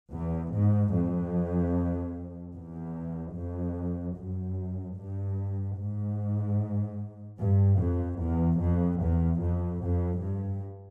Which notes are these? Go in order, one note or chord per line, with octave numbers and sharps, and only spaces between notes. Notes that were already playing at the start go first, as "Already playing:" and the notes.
E2
G#2
F2
E2
F2
F#2
G2
G#2
G2
F2
E2
F2
E2
F2
F2
G2